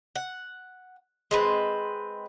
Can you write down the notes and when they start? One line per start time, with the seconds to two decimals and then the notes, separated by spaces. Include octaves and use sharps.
0.15 F#5
1.31 G#3 C4 B4